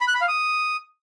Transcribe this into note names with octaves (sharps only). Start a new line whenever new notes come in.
B5
F#6
B5
F5
D#6